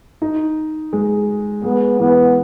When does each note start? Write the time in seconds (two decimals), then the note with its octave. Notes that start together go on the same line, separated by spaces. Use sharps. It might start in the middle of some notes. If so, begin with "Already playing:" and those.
0.22 D#4
0.93 G#3
1.64 G#3 B3
2.00 E3 B3